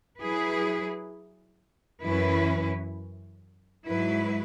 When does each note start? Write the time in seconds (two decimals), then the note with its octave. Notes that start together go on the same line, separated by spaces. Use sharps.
0.20 F#3 E4 G#4 B4
2.02 F#2 E3 C#4 E4 B4
3.84 G#2 F#3 E4 B4